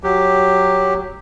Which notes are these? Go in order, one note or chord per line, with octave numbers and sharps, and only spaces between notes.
F#3 G4